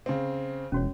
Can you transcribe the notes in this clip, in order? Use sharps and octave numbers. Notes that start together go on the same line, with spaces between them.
C#3 C4
E1 C#4 F#4 C#5